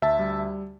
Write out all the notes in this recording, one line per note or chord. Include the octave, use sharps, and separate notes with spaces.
D2 E5 A5
G3